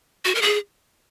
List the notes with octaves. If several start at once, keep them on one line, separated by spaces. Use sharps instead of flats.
F#4
A#4
G#4